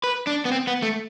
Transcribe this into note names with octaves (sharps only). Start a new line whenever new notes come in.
B4
D4
B3
C4
B3
A3